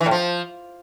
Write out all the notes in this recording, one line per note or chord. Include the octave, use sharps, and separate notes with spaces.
E3
A2
F3